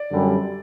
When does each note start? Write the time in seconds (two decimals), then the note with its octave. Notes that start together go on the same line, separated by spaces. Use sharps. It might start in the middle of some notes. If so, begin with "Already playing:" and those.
Already playing: D5
0.10 F#2 D3 G3